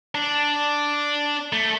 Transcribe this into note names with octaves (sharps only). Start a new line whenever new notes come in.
D4
A3